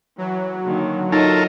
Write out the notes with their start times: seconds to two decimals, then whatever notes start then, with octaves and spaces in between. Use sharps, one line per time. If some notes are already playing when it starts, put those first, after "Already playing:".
0.18 E3 F#3
0.65 D3 D#3 A#3
1.12 D#4 F4 A4 A#4 C#5 D#5 E5